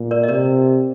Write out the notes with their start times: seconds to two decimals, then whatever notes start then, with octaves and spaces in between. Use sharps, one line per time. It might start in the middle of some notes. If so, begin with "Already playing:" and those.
Already playing: A#2
0.11 A#4 D5
0.23 D#5
0.28 C3 A#4 D5